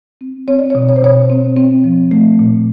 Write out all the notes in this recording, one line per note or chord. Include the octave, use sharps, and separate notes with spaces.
C4
C4 C#5
D5
B2 C#5
C#5
C5
B2 C#5
C4
C4
F3
A3
A#2